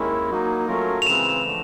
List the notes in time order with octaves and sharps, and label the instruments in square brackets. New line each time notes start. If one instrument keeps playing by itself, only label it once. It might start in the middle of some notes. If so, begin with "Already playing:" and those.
Already playing: [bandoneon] D#2 D#3 G#3 C#4 E4
F#3 A#3 D#4
F#3 A3 C#4 F4 A#4
[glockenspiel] F7
[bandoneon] C#3 E3 G#3 C4 [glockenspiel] E7
[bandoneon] D3 F3 A3